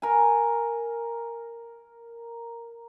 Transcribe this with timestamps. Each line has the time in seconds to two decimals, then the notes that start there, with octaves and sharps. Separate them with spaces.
0.02 A#4 G#5